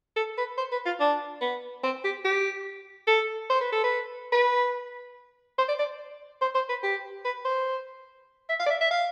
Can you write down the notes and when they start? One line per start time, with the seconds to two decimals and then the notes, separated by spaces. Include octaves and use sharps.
0.16 A4
0.38 B4
0.57 C5
0.72 B4
0.86 F4
1.00 D4
1.41 B3
1.83 C4
2.04 G4
2.24 G4
3.07 A4
3.50 C5
3.61 B4
3.72 A4
3.84 B4
4.32 B4
5.58 C5
5.68 D5
5.79 D5
6.41 C5
6.55 C5
6.69 B4
6.83 G4
7.25 B4
7.45 C5
8.49 E5
8.60 F5
8.66 D5
8.70 E5
8.81 E5
8.91 F5